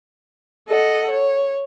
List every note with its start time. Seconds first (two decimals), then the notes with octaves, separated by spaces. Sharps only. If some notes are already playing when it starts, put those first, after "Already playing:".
0.69 A4 D#5 F#5
1.10 C#5